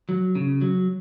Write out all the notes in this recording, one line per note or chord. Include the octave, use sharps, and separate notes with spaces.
F#3
C#3
F#3